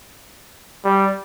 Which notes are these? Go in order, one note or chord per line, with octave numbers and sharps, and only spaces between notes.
G3